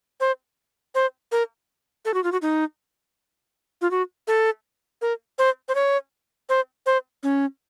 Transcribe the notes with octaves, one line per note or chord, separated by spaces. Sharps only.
C5
C5
A#4
A4
F#4
F4
F#4
D#4
F4
F#4
A4
A#4
C5
C5
C#5
C5
C5
C#4